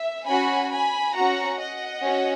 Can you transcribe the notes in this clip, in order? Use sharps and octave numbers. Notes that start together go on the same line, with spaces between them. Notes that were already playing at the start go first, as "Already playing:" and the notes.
Already playing: E5
C#4 F#4 G#5 B5
G#5 B5
C#4 F#4 F#5 A#5
D#5 F#5
C#4 F#4